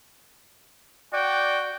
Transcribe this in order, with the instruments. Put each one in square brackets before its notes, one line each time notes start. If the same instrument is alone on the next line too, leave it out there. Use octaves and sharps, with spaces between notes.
[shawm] F#4 [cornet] D5 [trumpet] G5